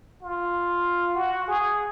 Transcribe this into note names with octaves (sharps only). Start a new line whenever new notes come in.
F4
F#4
G#4